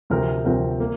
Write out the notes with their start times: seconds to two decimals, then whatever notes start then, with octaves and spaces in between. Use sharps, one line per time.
0.10 D2 C3 F3 C4 A#4
0.45 D2 C3 F3 C4 A#4
0.79 A#3 F4